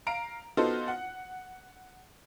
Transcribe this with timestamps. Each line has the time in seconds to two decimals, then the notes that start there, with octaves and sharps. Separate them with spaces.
0.07 F5 A#5 D7
0.57 B3 D#4 F4 F#4 A4 C5
0.88 F#5